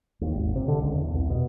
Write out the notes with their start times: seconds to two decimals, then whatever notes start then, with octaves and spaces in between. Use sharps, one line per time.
0.21 D#2
0.34 G#1
0.55 C3
0.68 D3
0.79 C#2
0.96 E2
1.14 C2
1.30 B2